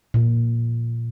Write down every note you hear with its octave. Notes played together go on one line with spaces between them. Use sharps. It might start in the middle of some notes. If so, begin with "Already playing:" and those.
A#2